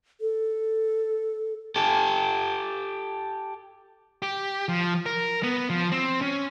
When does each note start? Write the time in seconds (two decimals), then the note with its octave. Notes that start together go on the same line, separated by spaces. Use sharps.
0.21 A4
1.76 G4 A4
4.22 G4
4.69 F3
5.06 A#4
5.43 B3
5.70 F3
5.92 C4
6.21 C#4